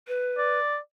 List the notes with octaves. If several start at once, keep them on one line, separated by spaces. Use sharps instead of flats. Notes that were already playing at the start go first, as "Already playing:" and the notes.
B4
D5